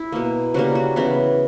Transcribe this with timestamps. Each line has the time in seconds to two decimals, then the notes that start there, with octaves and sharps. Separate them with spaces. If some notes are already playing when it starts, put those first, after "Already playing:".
Already playing: E4
0.12 B2 A#3
0.54 C#3 G3 A#3 F#4
0.75 F#4
0.96 C#3 E3 B3 F#4